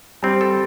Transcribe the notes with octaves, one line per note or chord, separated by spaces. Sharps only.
G3 C4
A4